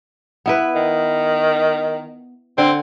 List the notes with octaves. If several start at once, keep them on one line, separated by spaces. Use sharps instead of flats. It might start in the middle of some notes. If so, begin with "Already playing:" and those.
B3 E4 B4
D#3
D3 C4